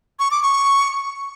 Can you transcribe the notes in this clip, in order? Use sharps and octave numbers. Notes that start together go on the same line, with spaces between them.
C#6
D6
C#6